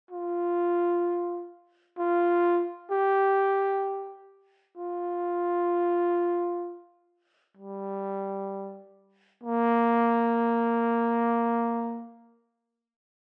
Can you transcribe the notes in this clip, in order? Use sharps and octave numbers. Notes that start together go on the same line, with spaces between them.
F4
F4
G4
F4
G3
A#3